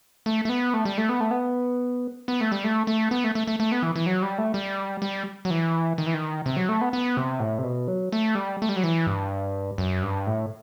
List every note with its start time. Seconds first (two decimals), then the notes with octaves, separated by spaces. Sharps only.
0.26 A3
0.45 A3
0.49 B3
0.74 A3
0.85 G3
0.98 A3
1.09 B3
1.20 A3
1.31 B3
2.28 B3
2.41 A3
2.52 G3
2.64 A3
2.87 A3
3.11 B3
3.24 A3
3.35 A3
3.47 A3
3.60 A3
3.72 B3
3.83 E3
3.96 E3
4.06 F#3
4.22 G3
4.38 A3
4.54 G3
5.02 G3
5.45 F#3
5.50 E3
5.98 D#3
6.06 E3
6.14 D#3
6.46 C3
6.57 F#3
6.69 A3
6.81 B3
6.93 B3
7.17 C3
7.40 A2
7.58 C3
7.64 B2
7.88 F#3
8.12 A3
8.35 G3
8.62 A3
8.69 G3
8.76 F#3
8.84 E3
9.07 G2
9.78 F#2
10.03 G2
10.27 A2